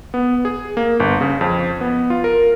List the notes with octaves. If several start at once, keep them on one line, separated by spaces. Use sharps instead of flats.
B3
G#4
A#3
G1
C#3
F2
B3
F4
A#4